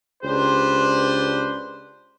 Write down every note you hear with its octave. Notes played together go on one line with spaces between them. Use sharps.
C#2 D4 G4 B4 C5